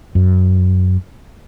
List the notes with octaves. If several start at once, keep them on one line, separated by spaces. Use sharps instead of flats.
F#2